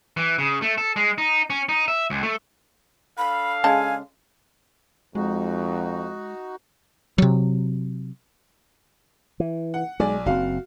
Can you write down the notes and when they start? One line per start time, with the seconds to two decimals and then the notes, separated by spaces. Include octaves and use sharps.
0.17 E3
0.39 C#3
0.62 A3
0.78 A4
0.96 G#3
1.18 D#4
1.50 C#4
1.69 D#4
1.88 E5
2.10 C#2
2.23 A3
3.18 D4 A4 F5 B5
3.64 C#3 G#3 G#5 A5
5.15 F2 G#3 D#4 F#4
7.18 C3 F#3
9.40 E3
9.74 F#5
10.00 B1 G#3 D5 G#5
10.26 F#1 C4 F#4 F5